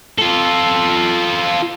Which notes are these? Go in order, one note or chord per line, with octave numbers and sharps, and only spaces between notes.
F4 A4